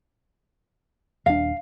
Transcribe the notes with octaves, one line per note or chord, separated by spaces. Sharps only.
D#1 D4 F5